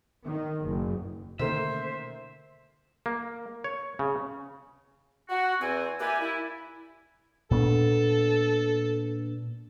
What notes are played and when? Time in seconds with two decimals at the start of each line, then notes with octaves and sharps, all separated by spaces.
0.24 D#3
0.65 F#1
1.39 B2 D3 D#3 A3 A#3 C#4 C5 E5
3.06 A#3
3.64 C#5
3.99 C#3
5.29 F#4
5.60 E2 C4 G#5
6.00 A#3 E4 G4 B4 D5 G#5
6.20 E4
7.51 A#2 B3 D4 A4